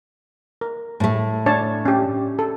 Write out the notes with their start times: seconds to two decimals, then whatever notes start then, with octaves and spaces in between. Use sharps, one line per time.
0.61 A#4
1.00 A2 A3
1.46 D4 C#5 A5
1.86 C#4 G4
2.39 A4